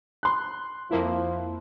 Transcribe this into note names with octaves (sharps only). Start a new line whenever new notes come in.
C6 F#6
F2 F3 A#3 E4